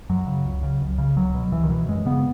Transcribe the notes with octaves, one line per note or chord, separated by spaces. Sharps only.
F#2 F#3
C#3
C#2
C#3
C#2
C#3
C#2 F#3
B2
C#2 E3
D#3
B2 E3
F#2 G#3
C#3 B3